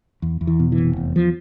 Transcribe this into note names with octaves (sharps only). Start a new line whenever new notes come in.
E2
E2
E3
B2
E3
F1
E2
F3